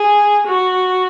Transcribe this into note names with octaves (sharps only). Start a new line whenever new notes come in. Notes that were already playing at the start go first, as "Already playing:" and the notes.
Already playing: G#4
F#4